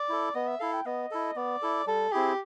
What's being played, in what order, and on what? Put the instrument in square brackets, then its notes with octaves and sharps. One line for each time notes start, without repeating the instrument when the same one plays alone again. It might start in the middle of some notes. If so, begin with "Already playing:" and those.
Already playing: [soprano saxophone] D5
[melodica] E4 A4
[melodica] B3 [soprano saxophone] D#5
[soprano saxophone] E5
[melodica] E4 A4 [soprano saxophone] F5
[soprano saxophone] G5
[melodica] B3 [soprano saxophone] D#5
[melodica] E4 A4
[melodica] B3 [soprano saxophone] D5
[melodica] E4 A4
[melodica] G3 [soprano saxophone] A4
[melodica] C4 E4 G#4 [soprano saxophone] G4